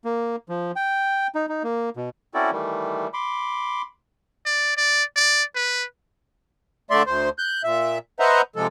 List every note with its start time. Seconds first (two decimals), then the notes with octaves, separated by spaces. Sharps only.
0.05 A#3
0.49 F3
0.76 G5
1.35 D#4
1.49 D#4
1.64 A#3
1.97 B2
2.34 C4 C#4 E4 F#4 A4 D5
2.52 D#3 E3 G3 A3
3.14 B5 C6 D6
4.45 D5
4.77 D5
5.16 D5
5.56 B4
6.91 D3 A3 D5 E5 C6
7.07 D2 C5
7.38 F#6 G6
7.64 A#2 E5
8.20 B4 C5 D#5 E5 F#5 A#5
8.56 C3 F3 G#3 A4